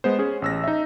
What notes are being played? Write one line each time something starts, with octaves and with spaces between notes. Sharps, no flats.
G#3 B3 C5
C#4 G#4
A1 E6 A#6
D#4 E5